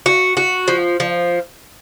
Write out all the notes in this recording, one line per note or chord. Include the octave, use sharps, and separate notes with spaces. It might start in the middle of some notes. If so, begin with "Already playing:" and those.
F#4
F#4
F3
F3